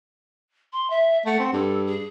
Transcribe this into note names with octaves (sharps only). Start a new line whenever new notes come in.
C6
E5
A3 F#5
C4
G2 A4
G#4